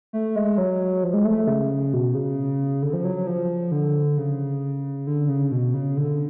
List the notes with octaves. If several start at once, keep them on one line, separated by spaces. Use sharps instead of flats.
A3
G#3
F#3
F3
G#3
A3
A3
C#3
B2
C#3
D3
F3
F#3
F#3
F3
D3
C#3
D3
C#3
B2
C#3
D3